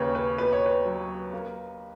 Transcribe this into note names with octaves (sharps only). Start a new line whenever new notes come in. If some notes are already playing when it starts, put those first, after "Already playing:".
Already playing: D#2 C#3 B4 C#5
B4
B2 B4
C#5
B4
F#3
A#3